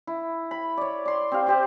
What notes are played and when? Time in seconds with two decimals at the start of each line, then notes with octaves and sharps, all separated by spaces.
0.07 E4
0.51 B5
0.77 C#5 D5
1.05 D5 C6
1.32 C4 G4 F5
1.47 C4 G4 C5